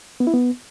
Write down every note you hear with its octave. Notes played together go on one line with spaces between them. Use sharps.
B3
E4
B3